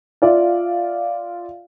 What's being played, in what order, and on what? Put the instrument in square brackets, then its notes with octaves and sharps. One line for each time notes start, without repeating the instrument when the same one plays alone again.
[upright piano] F4 D5 E5 F5